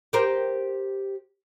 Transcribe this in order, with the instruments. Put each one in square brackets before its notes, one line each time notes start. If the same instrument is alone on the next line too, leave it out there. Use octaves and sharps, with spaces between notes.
[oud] G4 A#4 C5